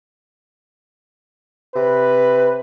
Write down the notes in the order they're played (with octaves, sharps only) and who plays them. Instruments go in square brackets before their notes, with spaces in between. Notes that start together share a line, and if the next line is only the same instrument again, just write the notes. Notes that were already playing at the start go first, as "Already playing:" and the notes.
[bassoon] C3 [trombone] B4